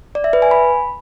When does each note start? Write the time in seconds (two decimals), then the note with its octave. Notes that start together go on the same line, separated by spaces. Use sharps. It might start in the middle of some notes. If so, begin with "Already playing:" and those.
0.15 D5
0.24 E5
0.33 B4
0.42 G#5
0.51 B5